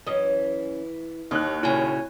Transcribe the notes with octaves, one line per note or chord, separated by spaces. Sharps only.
F#2 E3 C#4 D#5
D#2 D#4 D#5 F#6
A#2 C#3 E4 F#4 C#5 G#5